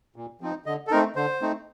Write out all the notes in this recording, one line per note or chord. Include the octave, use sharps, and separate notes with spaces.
A#2
F3 C4 D#4
D3 D#5
A4
A3 C4 D#4 A#4
D3 C5
A3 C4 D#4